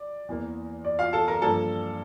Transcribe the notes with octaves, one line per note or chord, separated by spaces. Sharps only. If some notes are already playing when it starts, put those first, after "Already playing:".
Already playing: D5
E2 E3 A#3
D5
F4 F5
A4 A5
A#4 A#5
G2 F3 A#3 A4 A5